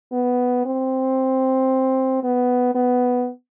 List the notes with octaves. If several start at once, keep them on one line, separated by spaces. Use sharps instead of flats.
B3
C4
B3
B3